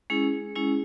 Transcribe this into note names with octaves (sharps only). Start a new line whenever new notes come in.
G#3 C#4 E4 G#4
G#3 C#4 E4